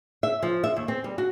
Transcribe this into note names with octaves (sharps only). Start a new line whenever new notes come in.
E5
F3
E5
D#2
C4
G3
F#4